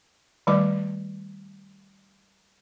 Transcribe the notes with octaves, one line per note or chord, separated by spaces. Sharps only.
D#3 G3 A3 D5 D6